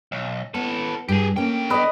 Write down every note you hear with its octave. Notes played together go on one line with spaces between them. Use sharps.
B1
B3 A4 B4
G2 G4 G#4
D3 A3 A#3 C#4 G5
B3 A4 B4 D5 D#5